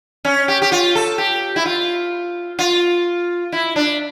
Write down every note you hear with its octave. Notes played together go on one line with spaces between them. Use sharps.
C#4
G4
G4
F4
A4
G4
E4
F4
F4
E4
D4